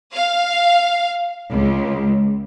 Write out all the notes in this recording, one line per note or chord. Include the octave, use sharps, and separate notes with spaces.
F5
C#2